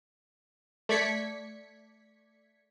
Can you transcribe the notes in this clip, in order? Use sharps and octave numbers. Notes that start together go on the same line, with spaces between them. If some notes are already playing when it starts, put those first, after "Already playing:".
A3 D5 G#6 B6 C#7